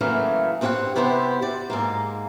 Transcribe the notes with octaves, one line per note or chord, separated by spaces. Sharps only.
C#3 E3 F#3 A3 A#3
G2 C4 F4 G4 C#5 F#5
C3 B3 E4 G4 B4 C5
F#4 D5
G#2 G#3 A#3